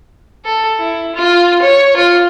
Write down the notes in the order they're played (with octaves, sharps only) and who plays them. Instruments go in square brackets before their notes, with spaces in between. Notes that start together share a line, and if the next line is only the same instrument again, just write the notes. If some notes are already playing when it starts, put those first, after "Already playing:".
[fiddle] A4
E4
F4
C#5
F4